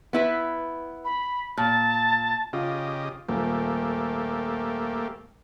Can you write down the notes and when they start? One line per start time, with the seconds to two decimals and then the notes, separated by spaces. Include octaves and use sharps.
0.13 B3 E4 B4
1.05 B5
1.57 A#2 A5
2.53 C#3 F4 G4 D#5
3.28 D#1 A3 A#3 G4